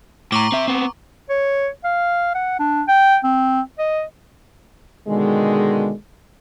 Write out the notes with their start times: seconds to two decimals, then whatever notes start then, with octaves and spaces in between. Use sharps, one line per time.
0.32 A2 A#5 C#6 D6
0.52 C4 E5
0.68 B3 C4
1.30 C#5
1.84 F5
2.35 F#5
2.59 D4
2.88 G5
3.24 C4
3.79 D#5
5.08 B2 D3 D#3 G#3